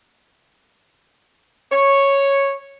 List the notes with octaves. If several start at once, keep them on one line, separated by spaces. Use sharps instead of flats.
C#5